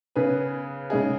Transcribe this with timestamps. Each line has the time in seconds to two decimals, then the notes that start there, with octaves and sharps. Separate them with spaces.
0.16 C#3 B3 G#4 B4
0.90 C#3 G#3 D#4 G#4